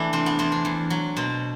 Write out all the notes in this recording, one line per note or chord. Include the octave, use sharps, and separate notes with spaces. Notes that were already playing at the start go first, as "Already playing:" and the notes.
Already playing: E3 A3 D4 E4
C3 C4
B3
E2 C4
D4
E2
F#3
B2 C4